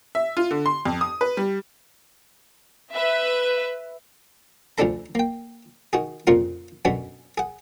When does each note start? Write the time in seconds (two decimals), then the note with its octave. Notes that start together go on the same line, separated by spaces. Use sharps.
0.15 E5
0.37 F4
0.51 D3
0.66 C6
0.85 F2
1.01 D#6
1.21 B4
1.37 G3
2.95 B4 E5
4.78 D2 F3 C#4 D4 A4 A#5
5.15 A#3 G5
5.93 D#3 F#4 G#4
6.27 F2 A#2 C#3 F4 A#4
6.85 F#2 B2 D3 B3 C#4 F#4
7.38 G#4 F#5